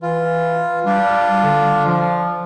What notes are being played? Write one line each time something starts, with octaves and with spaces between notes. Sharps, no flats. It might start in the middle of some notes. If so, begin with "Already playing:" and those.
E3 F4
G3 D4 F4
D3
F3